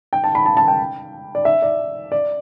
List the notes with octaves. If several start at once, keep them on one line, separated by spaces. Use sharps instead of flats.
G5
A5
B5
A5
A5
G5
D5
E5
D5
D5